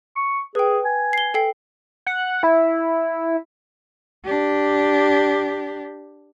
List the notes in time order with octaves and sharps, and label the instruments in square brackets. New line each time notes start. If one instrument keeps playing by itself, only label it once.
[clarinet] C#6
[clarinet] G#4 [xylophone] B4 G5
[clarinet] G#5
[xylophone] C7 G7
A4 G5 C7
[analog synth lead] F#5
E4
[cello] D4 G4